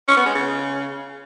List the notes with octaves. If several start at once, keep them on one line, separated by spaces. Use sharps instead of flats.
C#4
B3
G#3
C#3